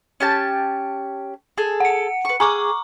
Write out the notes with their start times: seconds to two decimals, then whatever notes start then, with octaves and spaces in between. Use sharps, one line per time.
0.20 C#4 G4 A5
1.58 G#4 A4
1.80 F#5 C#7
2.25 B4 C#6
2.40 G#4 A#5 C#6 D6